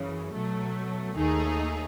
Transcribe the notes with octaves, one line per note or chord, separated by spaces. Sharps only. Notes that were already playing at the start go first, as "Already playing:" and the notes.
Already playing: F#2 C#3 E3
B2 F#3 A3
D#2 D#3 A3 D#4 G#4